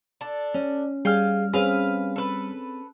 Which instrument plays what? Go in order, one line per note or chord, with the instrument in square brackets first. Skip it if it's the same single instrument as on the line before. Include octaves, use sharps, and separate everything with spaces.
[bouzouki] D4 A4
[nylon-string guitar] C#4
[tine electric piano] G3 F6 [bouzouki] G#4 F5 G5
[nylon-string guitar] C4 C#4 G#4 [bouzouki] B4 F5
[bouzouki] A4 B4